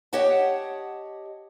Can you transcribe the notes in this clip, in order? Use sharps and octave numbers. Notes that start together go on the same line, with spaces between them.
G4 C#5 D#5 F#5 A5